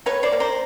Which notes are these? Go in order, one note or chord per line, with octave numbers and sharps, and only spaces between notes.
A#3 B4 C#5
C5 D5
A#3
A#4 C5